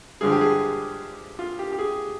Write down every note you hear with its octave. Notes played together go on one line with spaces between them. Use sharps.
G2 D3 F3 G#3 G#4
G4
G#4
F4
G4
G4
G#4